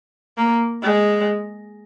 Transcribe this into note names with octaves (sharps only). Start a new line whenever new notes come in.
A#3
G#3